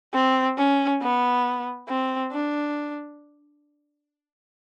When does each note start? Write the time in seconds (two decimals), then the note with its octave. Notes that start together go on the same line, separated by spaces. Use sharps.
0.14 C4
0.58 C#4
1.02 B3
1.89 C4
2.32 D4